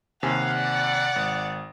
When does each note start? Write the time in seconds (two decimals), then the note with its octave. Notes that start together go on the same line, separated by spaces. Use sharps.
0.23 D#2 C3 F5 F#5 G#5
0.57 D5
1.16 G#1